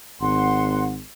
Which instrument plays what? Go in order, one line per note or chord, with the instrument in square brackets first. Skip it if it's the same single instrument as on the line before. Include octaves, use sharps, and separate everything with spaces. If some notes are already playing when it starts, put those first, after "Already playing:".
[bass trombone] G#1 [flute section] F#5 C6